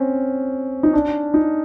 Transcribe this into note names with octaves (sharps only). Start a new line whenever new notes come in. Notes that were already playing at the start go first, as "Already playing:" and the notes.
Already playing: C4 C#4
D#4
D4
D#4